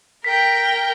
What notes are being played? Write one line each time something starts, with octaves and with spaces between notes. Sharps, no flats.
A#4 G5 B6